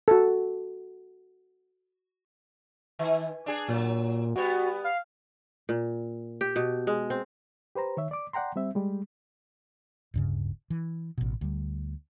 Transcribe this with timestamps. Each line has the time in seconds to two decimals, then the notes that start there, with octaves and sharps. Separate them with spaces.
0.08 F#4 A4
2.99 D#3
3.46 D4 G#4
3.68 A#2 F#3
4.36 G3 B3 F#4
4.84 F5
5.69 A#2
6.41 G4
6.56 B2
6.87 G#3
7.10 C4
7.75 G4 B4 C5 A#5
7.97 D#3 C#5 E5
8.11 D5 D6
8.33 D5 F#5 G5 A#5 C6
8.56 G3 C4 E5
8.75 G3 G#3
10.14 D1 G2 C#3
10.70 E3
11.18 A1 B2
11.41 D2 G3